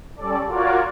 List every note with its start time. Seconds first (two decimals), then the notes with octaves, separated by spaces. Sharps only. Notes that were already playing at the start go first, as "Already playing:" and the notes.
0.16 G3 C#4 A4 D5
0.48 F4 F#4 A#4 C#5 D5